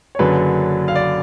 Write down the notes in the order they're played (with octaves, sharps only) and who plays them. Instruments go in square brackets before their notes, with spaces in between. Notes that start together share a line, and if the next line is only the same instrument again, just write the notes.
[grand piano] C#5
F#1 F#2 D3 F#3 B4
F5
D5